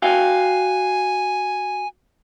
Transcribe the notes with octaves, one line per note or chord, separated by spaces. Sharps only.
F#4 F5 G5 G#5